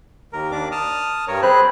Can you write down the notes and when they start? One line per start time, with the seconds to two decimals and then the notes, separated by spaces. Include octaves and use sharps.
0.33 D#2 A#4
0.52 D#2 D4 D6
0.72 A5 D#6 F6
1.28 G2 A#4 C#5
1.43 C4 G#4 C5 B5 F#6 G6